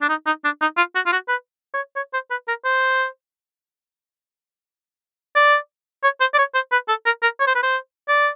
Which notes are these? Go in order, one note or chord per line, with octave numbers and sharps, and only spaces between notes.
D4
D#4
D#4
D4
D#4
F4
F#4
F4
F#4
B4
C#5
C#5
C5
B4
A#4
C5
D5
C#5
C5
D5
C#5
C5
B4
A4
A#4
A#4
C#5
C5
B4
C5
D5